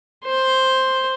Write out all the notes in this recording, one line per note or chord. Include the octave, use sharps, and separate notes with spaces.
C5